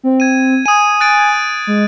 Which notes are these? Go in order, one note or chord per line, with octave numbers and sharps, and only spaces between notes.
C4
G#6 D#7
G#5 D#6 D#7
F#6 A6 D7
G#3